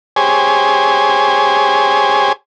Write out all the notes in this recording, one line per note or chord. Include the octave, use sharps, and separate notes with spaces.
G4 G#4 C5 C#5 G#5